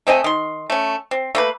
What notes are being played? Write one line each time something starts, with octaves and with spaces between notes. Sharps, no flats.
A3 C4 D#5 G#5
D#3 C6
A3 C#4
C4
A3 A#3 B4